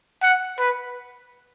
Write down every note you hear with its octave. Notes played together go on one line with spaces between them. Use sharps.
F#5
B4